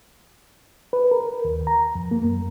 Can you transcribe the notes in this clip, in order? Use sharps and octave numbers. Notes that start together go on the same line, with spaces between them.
B4
A#4
D#2
A#5
F2
A#3
F#2